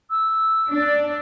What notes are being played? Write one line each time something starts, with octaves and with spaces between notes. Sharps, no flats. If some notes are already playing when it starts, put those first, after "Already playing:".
E6
D4